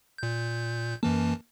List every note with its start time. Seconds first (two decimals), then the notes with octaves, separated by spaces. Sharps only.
0.18 A#2 G6
1.03 F#2 E3 A#3 A5